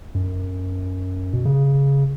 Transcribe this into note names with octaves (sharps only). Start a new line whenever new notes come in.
F#2
B2
C#3